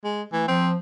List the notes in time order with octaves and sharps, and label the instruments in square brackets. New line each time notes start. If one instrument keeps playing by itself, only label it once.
[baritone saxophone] G#3
[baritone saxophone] E3 [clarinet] A3
[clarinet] F3 [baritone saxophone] C4